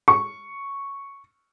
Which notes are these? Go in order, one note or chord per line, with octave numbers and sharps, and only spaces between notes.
C#6